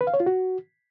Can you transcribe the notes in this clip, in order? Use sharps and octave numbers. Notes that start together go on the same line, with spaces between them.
B4
F5
C#5
F4
F#4